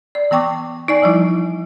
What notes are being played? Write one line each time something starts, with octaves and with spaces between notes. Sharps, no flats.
D5
E3 B3 G5 C#6 D6
D#4 D5 G#5
E3 F3 G3 D#4 E4